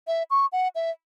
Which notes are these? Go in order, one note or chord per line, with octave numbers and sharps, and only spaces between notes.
E5
C#6
F#5
E5